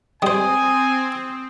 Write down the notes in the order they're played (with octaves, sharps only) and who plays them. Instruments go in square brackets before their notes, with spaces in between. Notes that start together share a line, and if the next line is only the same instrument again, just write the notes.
[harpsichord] G3 C5 [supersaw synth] C4 [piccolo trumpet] G#5 [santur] D#6